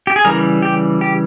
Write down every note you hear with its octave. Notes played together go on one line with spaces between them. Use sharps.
G4
G#4
C#3 E3 G3 A#4
G4
G4